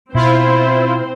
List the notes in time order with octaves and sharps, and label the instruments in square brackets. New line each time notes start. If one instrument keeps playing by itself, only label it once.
[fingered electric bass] B2 [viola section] C4 C5 [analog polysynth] E4 F4